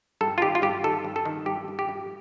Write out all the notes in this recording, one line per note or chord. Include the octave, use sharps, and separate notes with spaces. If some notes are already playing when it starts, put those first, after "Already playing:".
G2 A4
F4
D#3 G4
F4
G2 G4
D#3 A4
G2
A4
D#3
G2 G4
G2
G4
G2